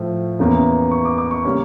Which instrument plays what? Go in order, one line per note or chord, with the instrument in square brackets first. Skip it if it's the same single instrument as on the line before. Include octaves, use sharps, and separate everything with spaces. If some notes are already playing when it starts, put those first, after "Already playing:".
Already playing: [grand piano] A2 F3 A3
E2 E3 A#3 C#4
C#6
D6
D6
C#6
C#3 G3 A#3 C#4